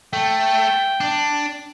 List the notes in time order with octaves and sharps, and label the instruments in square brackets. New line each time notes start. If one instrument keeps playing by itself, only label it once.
[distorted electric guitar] A3 [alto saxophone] G5
[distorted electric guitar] D4